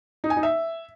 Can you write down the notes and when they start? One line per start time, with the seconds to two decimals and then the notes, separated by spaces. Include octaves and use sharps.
0.24 D#4
0.30 G#5
0.37 D#4
0.43 E5